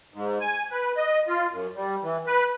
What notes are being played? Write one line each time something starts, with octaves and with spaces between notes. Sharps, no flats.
G#2
G#5
B4
D#5
F4
F#2
G3
E3
B4